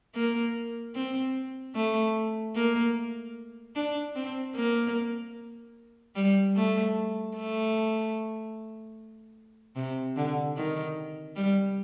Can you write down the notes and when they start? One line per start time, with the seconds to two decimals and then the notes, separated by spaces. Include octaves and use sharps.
0.15 A#3
0.95 C4
1.75 A3
2.56 A#3
3.76 D4
4.15 C4
4.55 A#3
6.16 G3
6.56 A3
7.36 A3
9.76 C3
10.17 D3
10.56 D#3
11.36 G3